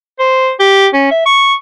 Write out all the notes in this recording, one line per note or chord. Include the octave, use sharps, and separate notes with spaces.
C5
G4
C#4
E5
C#6